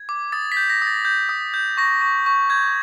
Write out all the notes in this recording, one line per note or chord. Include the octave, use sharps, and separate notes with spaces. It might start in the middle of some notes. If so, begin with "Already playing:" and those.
Already playing: G#6
D6
D#6 A6
B6
G6
A#6
D#6
A6
G6
D#6
G6
C#6 A#6
C#6
C#6
G6 G#6